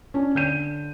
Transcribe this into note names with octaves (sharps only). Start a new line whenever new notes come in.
C#4 D4
D3 G6 D#7